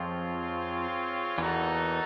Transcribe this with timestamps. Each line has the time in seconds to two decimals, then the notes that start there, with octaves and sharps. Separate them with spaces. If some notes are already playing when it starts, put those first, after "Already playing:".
Already playing: F2 F3 C4 F4 G#4 C#5
1.38 E2 E3 A#3 D#4 F#4 A4